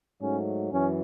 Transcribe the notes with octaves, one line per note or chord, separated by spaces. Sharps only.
G#2 F#3 A3 C#4
F#2 E3 C#4